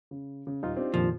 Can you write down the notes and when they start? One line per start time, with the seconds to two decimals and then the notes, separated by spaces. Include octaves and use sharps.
0.11 C#3
0.47 C#3
0.63 D#1 D#4 F4
0.77 C4 D4 G4
0.94 F2 A#2 D#3 F3